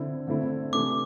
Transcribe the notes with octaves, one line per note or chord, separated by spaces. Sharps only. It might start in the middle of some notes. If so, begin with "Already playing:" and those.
Already playing: D3 C4 E4
D3 A3 C4 E4
C3 E3 A3 D6